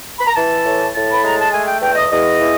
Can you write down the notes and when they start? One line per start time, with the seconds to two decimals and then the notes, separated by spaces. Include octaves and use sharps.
0.20 B5
0.28 A#5
0.35 E3 A5
0.65 A2
0.94 A2 A5
1.13 B5
1.23 G#3 A#5
1.40 A5
1.53 A3 G#5
1.67 G5
1.81 E2 G5
1.96 D#5
2.11 E2 D#5
2.41 E3